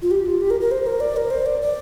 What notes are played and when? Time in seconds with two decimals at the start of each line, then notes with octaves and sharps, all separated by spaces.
0.02 F4
0.11 G4
0.26 F4
0.41 G4
0.50 A#4
0.61 A#4
0.71 C5
0.86 A#4
1.00 D5
1.17 A#4
1.31 C5
1.46 D5
1.62 D5